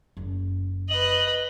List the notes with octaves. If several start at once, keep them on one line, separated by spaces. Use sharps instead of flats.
F#1
B4 D#5 F#7